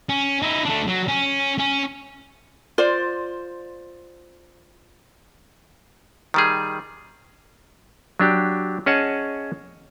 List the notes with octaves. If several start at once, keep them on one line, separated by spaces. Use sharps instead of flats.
C#4
D#4 E4
A3 D4
F#3
C#4
C#4
F4 C5 D5
D#3 G3 G#4
F#3 D4 G4
C#4 G#4 C#5 D#5 F#5 A5